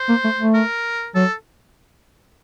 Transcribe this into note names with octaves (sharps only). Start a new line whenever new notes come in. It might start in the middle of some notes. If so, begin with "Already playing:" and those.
Already playing: C5
A#3
A3
A3
A#4
F#3 A4